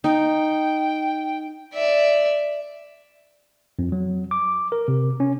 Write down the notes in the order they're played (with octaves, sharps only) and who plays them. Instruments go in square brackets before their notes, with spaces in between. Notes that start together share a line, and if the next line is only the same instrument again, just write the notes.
[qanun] D#4 [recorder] G5
[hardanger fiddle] D5 E5
[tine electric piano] F2
F#3
D6
A#4
C3
C#4